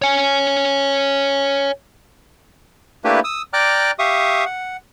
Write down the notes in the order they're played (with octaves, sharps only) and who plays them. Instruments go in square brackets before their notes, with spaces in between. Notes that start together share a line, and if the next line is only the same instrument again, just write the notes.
[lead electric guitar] C#5 G#5
[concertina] A3 A#3 D4 E4 G4 B4
D#6 E6
D5 G5 A#5 D6 F6 F#6
G4 E5 F5 C#6 D#6
F#5